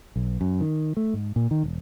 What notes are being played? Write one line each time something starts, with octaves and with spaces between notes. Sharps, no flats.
B1
F#2
D#3
A3
G#2
A#2
D#3
E1